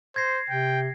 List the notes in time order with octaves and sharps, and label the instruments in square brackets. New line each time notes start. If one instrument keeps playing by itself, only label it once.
[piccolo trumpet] C5 [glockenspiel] G#6 A#6 C7
[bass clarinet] C3 [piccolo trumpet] G5